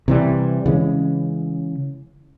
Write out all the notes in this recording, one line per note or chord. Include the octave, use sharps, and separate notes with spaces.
C3 E3 G3
C#3 E3 G#3 C#4